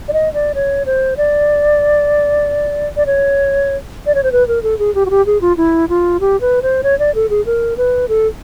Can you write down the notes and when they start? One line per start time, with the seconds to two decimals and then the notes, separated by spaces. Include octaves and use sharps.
0.08 D5
0.13 D#5
0.34 D5
0.55 C#5
0.86 C5
1.17 D5
2.97 D5
3.06 C#5
4.06 D5
4.15 C#5
4.23 C5
4.32 B4
4.48 A#4
4.63 A4
4.79 G#4
4.95 G4
5.06 F#4
5.10 G4
5.26 G#4
5.41 F4
5.57 E4
5.89 F4
6.20 G4
6.41 B4
6.62 C5
6.83 C#5
6.99 D5
7.15 A4
7.30 G#4
7.46 A#4
7.77 B4
8.09 A4